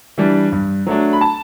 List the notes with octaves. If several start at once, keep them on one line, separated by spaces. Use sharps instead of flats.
E3 G3 D4
G2
F#3 A3 D4
B5
A5